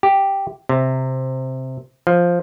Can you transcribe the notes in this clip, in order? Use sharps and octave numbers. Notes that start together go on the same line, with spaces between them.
G4
C3
F3